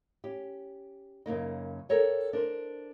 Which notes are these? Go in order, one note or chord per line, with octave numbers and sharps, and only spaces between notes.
C#4 G4
F#2 C#3 A#3 D#4
A4 A#4 C#5 G5
D4 A#4 C5